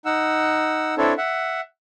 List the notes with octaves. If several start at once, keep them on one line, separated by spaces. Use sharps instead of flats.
D#4 F#5 E6
C4 D4 E4 A4 C#5
E5 F#5